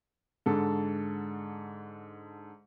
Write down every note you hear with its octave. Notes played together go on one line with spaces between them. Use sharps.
G#2 D3 A4